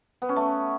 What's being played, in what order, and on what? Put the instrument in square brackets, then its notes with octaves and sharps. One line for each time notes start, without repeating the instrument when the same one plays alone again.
[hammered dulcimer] B3
C#4
A3